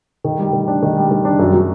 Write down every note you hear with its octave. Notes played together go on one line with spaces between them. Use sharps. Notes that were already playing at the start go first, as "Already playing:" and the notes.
D#3
G3
D#3
D4
D#3
G3
D#3
D4
F#2
F#3